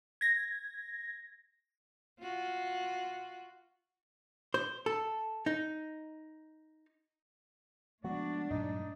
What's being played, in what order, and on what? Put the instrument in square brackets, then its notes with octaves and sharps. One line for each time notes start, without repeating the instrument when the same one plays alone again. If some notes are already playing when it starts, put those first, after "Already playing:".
[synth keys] G#6 A#6
[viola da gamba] F4 F#4
[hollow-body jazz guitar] C5
A4
D#4
[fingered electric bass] F3 G#3 B3 [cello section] A3 D4 [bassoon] F#4
[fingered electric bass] G2 A#2 F#3 [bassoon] D#4